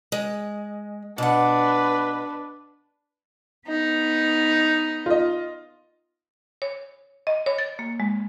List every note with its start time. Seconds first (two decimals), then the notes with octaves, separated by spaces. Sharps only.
0.12 G#3
1.18 B2 D4 B4 F#5
3.67 B3 D#4
5.06 F4 D#5
6.62 C#5
7.27 D#5
7.46 C#5
7.58 A6
7.79 A#3
8.00 G#3